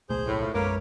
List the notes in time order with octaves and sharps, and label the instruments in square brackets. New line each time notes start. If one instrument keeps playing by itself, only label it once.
[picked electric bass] D1 B1 A3 [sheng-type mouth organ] G#4 C5 G6
[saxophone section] A2
[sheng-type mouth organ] F4
[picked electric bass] B1 F#2 G#3 [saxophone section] A#3 [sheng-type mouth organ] A#4 B4 C#5